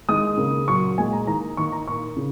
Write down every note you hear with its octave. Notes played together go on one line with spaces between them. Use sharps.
D#3 G#3 D#6
C#3 A#3
A#2 F#3 A#3 C#6
A#2 G#3 G#5
A#5
D#3 A#3 A#5
D#3 A#3 C#6
A#5
A#2 A#3 C#6
C#3